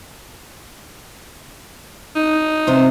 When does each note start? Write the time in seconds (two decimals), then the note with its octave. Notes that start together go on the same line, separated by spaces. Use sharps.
2.16 D#4
2.67 C3 C5